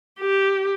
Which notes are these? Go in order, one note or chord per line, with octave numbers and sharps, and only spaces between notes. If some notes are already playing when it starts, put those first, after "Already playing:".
G4